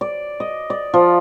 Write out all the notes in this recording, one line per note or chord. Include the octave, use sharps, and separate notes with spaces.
D5
D#5
D5
F3